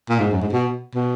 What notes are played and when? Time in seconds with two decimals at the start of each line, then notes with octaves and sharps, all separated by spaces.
0.10 A#2
0.20 G#2
0.31 F#2
0.42 G#2
0.53 B2
0.95 B2